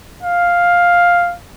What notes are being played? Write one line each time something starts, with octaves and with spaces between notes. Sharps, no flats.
F5